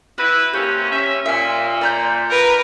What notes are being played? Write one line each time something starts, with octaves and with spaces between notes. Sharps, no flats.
E4 F#4 B4
C3 A#3 C#4 G4
C#4 E5
A#2 E5 G#5
D5 A#5 G6
A#4 B4